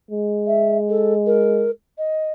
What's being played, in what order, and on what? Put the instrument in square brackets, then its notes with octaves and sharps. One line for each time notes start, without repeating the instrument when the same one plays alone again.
[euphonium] G#3
[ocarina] E5
A4
A#4
D#5